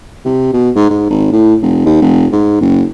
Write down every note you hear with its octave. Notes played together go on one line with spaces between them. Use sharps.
C3
B2
G#2
G#2
G#1
A2
F1
D#2
F1
G#2
F#1